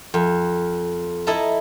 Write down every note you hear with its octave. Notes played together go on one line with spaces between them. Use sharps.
F2
E4 A4 D#5 A5 A#5